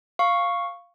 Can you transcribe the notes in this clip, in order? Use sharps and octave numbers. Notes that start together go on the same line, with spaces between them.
F5 C#6